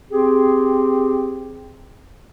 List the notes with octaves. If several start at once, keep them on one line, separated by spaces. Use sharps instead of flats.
C4 G4 G#4